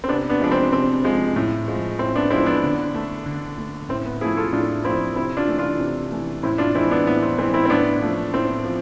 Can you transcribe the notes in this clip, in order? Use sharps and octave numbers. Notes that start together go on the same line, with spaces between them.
C4
C3 B3 D4
B3 D4
F3 G#3 D4
C4
C3 C4
F3 G#3
A2
F3 G#3
A2 C4
B3 D4
F3 G#3 C4 E4
B3 D4
D3
A3
D3
A3
A2 C4
B3
F3 A3 E4 G#4
F4 A4
A2 D4 F4
F3 A3 C4 E4
C3 C4 E4
D4 F4
E3 A3
D4 F4
C3
E3 A3
A2 C4 E4
D4 F4
E3 G#3 C4 E4
B3 D4
A2 B3
C4
E3 G#3 C4
C4 E4
C4
A2 B3 D4
F3 A3
A2 C4
F3